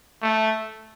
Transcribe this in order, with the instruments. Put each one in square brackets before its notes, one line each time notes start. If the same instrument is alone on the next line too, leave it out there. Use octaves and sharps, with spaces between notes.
[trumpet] A3